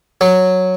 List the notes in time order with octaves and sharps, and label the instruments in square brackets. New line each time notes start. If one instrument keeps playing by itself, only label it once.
[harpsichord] F#3